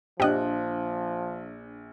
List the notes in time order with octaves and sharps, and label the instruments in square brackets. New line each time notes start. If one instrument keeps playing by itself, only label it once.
[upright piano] A#1 F#6 [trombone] F3 [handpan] D4 C5 [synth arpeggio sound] G4 D#5